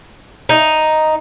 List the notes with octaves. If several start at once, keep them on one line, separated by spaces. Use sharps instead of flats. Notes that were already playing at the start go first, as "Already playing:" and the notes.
D#4